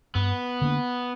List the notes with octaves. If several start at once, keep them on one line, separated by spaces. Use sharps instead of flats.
G2 B3
D3 A#3 D4